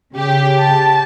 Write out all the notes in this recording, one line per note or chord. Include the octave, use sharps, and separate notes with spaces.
C#3 G4
A5